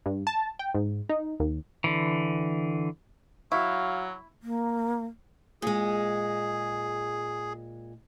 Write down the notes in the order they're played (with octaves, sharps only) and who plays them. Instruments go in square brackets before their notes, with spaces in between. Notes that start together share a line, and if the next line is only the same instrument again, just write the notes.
[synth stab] G2
A5
G5
G#2
D#4
D#2
[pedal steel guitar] D3 E3
[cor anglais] F#3 [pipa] E4 [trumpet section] F#4 F5 [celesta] C#6 E6
[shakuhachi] A#3
[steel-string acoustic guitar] A#2 G#3 [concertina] G#4